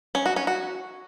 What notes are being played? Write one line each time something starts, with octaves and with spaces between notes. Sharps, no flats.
C#4
F#4
C#4
F#4